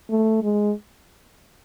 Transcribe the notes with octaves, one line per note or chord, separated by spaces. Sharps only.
A3
G#3